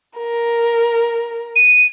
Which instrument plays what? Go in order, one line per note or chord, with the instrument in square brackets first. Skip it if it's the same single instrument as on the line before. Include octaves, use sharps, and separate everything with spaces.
[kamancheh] A#4
[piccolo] D#7